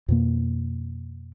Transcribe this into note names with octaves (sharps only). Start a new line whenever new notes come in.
F2 B2 A#3